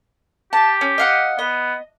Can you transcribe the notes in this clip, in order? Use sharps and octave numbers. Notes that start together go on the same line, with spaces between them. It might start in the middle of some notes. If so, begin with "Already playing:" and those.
G4 A5
C#4
D#5 F5 F#5
B3 D#5